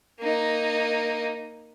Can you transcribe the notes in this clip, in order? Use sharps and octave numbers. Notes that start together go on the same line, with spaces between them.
A#3 D#4